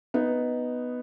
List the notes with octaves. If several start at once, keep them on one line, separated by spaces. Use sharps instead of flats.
B3 D#4